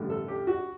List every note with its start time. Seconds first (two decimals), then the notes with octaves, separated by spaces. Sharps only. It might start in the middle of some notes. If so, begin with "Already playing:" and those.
Already playing: A1 G2 D3
0.10 A4
0.28 G4
0.47 F#4